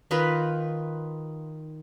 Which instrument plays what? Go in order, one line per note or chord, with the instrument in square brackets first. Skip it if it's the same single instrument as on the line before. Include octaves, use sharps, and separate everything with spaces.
[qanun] D#3 D#4 F4 B4